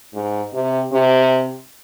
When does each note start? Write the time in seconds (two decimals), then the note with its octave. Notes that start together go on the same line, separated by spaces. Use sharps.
0.14 G#2
0.53 C3
0.92 C3